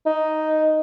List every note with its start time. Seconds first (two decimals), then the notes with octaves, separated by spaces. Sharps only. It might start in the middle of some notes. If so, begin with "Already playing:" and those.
0.06 D#4